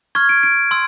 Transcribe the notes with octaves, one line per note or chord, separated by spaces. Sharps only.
C#6 F6 G#6
D7
D7
C6 E6